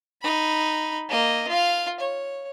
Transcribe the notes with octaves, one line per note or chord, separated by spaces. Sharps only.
D#4 B5
A#3 D#5
F4 F5
C#5